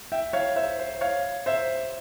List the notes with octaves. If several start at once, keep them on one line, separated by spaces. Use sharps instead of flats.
E5 G5
C#5 F5
C5 E5
C5
C#5 F5
C5 E5